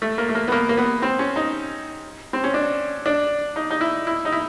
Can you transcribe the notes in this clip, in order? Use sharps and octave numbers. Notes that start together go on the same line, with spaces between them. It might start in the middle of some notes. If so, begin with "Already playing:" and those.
A3
A#3
A3
A#3
B3
A#3
A#3
B3
C4
C#4
D#4
C4
C#4
D4
D4
D#4
D#4
E4
E4
D#4
E4